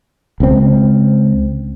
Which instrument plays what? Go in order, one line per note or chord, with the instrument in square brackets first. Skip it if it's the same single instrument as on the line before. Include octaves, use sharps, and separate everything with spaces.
[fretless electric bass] C#2 C4